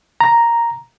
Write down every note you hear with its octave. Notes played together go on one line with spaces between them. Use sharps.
A#5